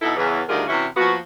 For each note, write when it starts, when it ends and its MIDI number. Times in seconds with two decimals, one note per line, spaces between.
0.02 0.15 47
0.02 0.15 63
0.02 0.15 64
0.02 0.15 69
0.17 0.42 40
0.17 0.42 49
0.17 0.42 52
0.49 0.63 38
0.49 0.63 51
0.49 0.63 55
0.49 0.63 65
0.49 0.63 68
0.49 0.63 70
0.68 0.87 48
0.68 0.87 52
0.68 0.87 61
0.68 0.87 64
0.68 0.87 66
0.97 1.17 53
0.97 1.17 58
0.97 1.17 59
0.97 1.17 66